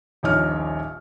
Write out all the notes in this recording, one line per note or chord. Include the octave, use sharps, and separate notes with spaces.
D#1 A#1 D#4 C#5 F6